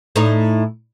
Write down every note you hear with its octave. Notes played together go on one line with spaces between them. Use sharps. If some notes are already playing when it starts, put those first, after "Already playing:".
A2 D#4